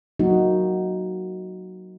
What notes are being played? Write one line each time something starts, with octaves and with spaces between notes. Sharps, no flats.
F#3 A#3 D#4 F#4